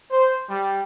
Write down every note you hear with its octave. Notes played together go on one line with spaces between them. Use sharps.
C5
G3